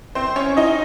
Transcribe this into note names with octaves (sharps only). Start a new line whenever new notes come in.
C4 C5
C#4 C#5
D#4 D#5